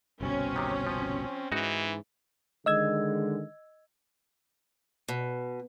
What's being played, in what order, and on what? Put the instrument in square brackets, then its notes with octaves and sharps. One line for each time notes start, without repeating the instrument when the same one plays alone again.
[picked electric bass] G1 C2 B2 [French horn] C4 [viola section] C#4
[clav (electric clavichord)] C3 D#3
F3
[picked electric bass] G#2 [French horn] E3 [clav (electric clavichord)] D#4 F#4
[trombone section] D3 D#3 G#3 [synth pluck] D#5 E6 G#6
[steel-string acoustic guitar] B2